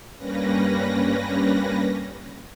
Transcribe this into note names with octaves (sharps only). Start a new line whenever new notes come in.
G2 G3 A#3 C#4 B4 A#6